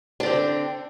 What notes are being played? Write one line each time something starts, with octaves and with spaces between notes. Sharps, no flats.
D3 C4 D4